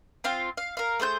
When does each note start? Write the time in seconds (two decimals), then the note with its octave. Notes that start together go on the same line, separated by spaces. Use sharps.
0.24 C4 F4 F5
0.57 F5
0.77 A#4 F5
1.00 A3 G#4 C5 G6